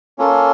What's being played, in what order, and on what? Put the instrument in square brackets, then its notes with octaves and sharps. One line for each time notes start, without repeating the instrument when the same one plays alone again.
[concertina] A#3 C#4 F4 A4